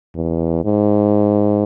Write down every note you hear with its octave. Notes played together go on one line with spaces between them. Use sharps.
E2
G#2